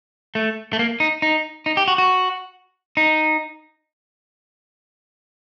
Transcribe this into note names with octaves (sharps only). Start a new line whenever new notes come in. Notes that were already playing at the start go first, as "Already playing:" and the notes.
A3
A3
A#3
D#4
D#4
D#4
G4
F#4
F#4
D#4